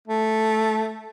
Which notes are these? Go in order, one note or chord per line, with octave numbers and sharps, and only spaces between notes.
A3